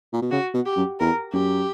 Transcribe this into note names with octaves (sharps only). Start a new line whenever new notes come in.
A#2
B2
C#3 F#4
B2
G4
F#2
E2 A#4
F#2 G4